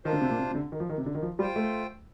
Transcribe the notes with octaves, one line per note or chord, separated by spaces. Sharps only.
D#3 D4 F4 C5
D3
C3
A#2
C3
C3
D3
D#3
F3
D#3
C3
D3
D#3
F3
G3 F4 C5 G5
A3